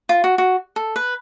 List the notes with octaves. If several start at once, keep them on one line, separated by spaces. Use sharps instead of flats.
F4
F#4
F#4
A4
B4